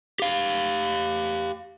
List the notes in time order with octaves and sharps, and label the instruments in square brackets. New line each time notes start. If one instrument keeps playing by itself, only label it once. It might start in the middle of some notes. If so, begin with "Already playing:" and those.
[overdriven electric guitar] G4 F5